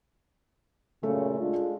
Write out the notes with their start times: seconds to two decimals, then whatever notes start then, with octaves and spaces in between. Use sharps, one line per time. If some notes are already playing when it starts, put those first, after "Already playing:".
1.03 F#2 A#2 C#3 A3
1.39 G#3 D4 F4